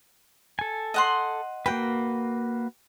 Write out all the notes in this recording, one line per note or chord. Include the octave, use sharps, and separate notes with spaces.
A4 G#5
D#5 F#5 C6
A#3 F#4 B4 G5